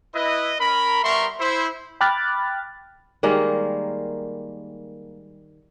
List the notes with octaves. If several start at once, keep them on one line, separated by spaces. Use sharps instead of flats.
E4 B4 D#5
C#4 A#4 B5
G3 B3 A#4 E5 C6 C#6
E4 C5
G5 B5 D6 F6 F#6 A6
D#3 G3 G#3 A#3